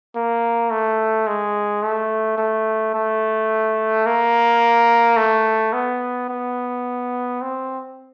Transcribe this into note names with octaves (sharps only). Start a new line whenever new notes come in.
A#3
A3
G#3
A3
A3
A3
A#3
A3
B3
B3
C4